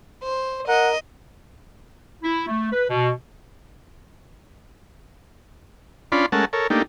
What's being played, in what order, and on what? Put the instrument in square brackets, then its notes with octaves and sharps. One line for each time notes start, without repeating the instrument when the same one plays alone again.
[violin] C5
[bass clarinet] A#4 [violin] D#5 [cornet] F#5
[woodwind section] E4
A3
B4
B2
[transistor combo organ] C#4 D4 F4 D5 B5 C6
G#3 A3 C#4 A#4 F#5 A5
A4 A#4 C#5
A3 A#3 D4 D#4 G4